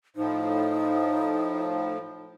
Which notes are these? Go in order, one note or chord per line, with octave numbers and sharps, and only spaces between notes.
A2 F3 D#4